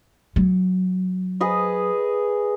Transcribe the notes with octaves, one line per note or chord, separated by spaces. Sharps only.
F#3
G#4 B4 D#5